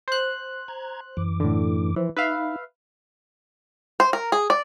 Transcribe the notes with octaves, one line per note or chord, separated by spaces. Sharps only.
C5 F#6
A#5 G#6
F#2 E3 D6
A2 D3
E3 F3 C5
D#4 B4 E5 F5
C5
A#4
G#4
D5